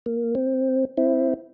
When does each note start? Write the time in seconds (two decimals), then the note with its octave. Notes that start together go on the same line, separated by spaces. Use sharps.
0.06 A#3
0.35 C4
0.97 C4 E4